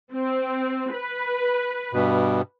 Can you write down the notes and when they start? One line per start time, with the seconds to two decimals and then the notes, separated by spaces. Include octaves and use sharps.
0.13 C4
0.93 B4
1.93 G2 B2